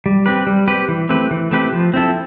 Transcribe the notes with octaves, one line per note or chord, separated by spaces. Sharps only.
G3
C4 G4 B4
G3
C4 G4 B4
E3
A3 C4 G4 B4
E3
A3 C4 G4 B4
F3
C4 E4 A4